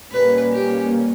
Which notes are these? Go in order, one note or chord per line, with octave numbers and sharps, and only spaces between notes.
A#2 G3 A#3 C#4 B4
G4